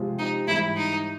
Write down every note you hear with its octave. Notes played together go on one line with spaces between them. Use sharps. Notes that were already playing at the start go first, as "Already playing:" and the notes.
Already playing: C3 F3 G#3
D#4
G#2 E3 G3 E4
D#4